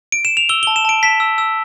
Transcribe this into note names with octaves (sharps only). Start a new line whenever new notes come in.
D7
E7
F7
E6 G7
G7
A5
E7
A5 D7
A5 B6
E6
E6